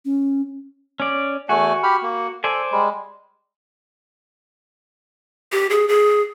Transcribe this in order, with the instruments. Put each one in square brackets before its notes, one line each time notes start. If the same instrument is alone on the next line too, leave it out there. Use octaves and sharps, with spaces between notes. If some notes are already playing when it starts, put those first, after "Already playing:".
[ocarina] C#4
[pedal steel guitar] C#4 D5
[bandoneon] E2 A3 G#5 [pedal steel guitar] F#4
[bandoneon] G4 B5 F6
A#3
[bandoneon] A4 [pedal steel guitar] C5 D5 G#5
[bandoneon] G3 G#3
[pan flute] G4
G#4
G#4